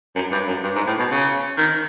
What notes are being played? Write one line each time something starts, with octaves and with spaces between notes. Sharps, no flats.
F#2
G2
F#2
G2
G#2
A2
B2
C#3
D#3